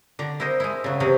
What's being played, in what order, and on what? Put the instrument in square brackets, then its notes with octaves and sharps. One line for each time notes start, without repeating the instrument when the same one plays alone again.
[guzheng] D3 D5 A#5
E4 A#4 C5 D#5
G#3 E4
C#3 F#3
C3 E3 F#3 C4 G#4